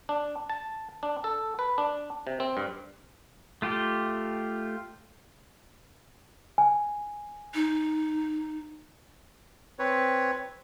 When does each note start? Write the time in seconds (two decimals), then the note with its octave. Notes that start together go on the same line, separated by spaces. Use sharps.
0.09 D4
0.50 A5
1.03 D4
1.24 A4
1.59 B4
1.78 D4
2.27 C3
2.40 C4
2.57 G2
3.62 A3 F4 G4
6.58 G#5
7.54 D#4
9.79 C4 B4 C#5